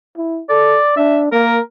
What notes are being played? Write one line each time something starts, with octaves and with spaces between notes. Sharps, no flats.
E4
A4 D5
D4 E5
A#3 A#4